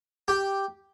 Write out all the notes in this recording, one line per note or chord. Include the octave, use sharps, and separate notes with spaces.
G4